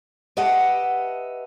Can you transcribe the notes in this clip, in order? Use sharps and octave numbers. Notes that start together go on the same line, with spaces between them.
G4 B4 D#5 E5 F#5 A5